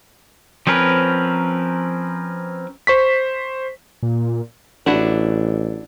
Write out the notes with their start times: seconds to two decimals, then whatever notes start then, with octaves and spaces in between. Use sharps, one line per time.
0.67 F3 C4 C#4 A#4 B4
2.87 C5 C#6 B6
4.03 A#2
4.86 A1 D4 E4 F#4